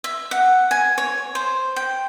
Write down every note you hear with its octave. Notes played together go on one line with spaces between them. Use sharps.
E5
F#5
G#5
C#5
C5
G5